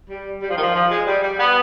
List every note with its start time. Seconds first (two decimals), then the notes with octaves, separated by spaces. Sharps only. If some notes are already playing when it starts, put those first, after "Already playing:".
0.09 G3
0.42 G3
0.49 F3
0.56 D#3
0.63 F3
0.74 F3
0.91 G#3
1.07 G3
1.23 G3
1.39 B3